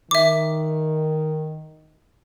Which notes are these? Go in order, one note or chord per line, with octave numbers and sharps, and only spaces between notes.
D#3 E5 D6